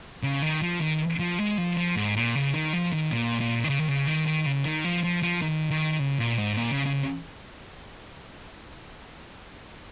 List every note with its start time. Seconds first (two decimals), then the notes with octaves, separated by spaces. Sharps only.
0.23 C#3
0.42 D#3
0.62 F3
0.81 D#3
1.19 F3
1.39 G#3
1.58 F3
1.77 F3
1.96 G#2
2.16 A#2
2.35 C#3
2.54 D#3
2.73 F3
2.92 D#3
3.12 A#2
3.41 A#2
3.64 D#3
3.69 C#3
3.79 D#3
3.88 C#3
4.07 D#3
4.27 D#3
4.46 C#3
4.65 D#3
4.85 F3
5.03 F3
5.23 F3
5.42 D#3
5.71 D#3
6.00 C#3
6.19 A#2
6.38 G#2
6.57 A#2
6.72 C#3
6.86 C#3